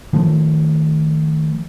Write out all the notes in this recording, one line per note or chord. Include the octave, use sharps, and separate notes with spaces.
D#3 F3 A3